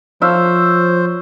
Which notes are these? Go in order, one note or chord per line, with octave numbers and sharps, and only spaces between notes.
F3 C5 C#5 E5 F5